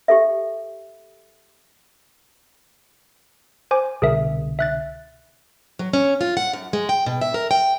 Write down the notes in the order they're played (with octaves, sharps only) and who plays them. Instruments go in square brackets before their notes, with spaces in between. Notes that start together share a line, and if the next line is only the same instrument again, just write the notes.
[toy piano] G4 A4 E5
[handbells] C5 G#5 D6
[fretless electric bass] C2 B2 D3 [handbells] G#4 A#4 E5
[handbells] E5 F#6 A6
[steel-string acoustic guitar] F#3
C#4
F4
F#5
F#2
G#3
G5
B2
E5
A#4
G5